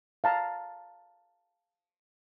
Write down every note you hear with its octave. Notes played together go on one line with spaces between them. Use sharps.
F5 A5 A#5